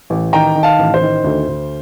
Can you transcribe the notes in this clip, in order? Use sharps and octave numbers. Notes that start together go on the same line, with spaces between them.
A1
D#3 G5 A#5
D#3
F5 A5
A1
C5
D#3
D2
D2